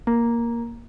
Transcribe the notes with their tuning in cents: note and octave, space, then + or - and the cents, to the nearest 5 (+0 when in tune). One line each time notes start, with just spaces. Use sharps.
A#3 +5